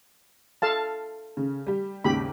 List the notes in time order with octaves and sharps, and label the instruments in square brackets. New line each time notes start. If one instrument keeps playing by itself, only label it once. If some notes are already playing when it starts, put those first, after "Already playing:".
[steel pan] A4 F5 A5
[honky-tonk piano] C#3
G3 G4
[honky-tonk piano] D#2 G#2 C#3 [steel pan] G4 B5